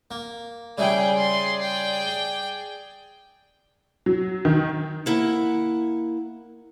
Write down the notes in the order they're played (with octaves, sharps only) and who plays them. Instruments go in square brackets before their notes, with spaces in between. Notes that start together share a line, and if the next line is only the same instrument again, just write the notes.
[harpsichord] A#3
[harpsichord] C#3 G3 E4 [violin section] G#4 G5
[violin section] G#4 D5 [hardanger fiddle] C6
[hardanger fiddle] G5
[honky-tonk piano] F#3
D#3
[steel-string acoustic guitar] A#3 E4 F#5